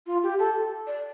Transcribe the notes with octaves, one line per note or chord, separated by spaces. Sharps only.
F4
G4
A4
D5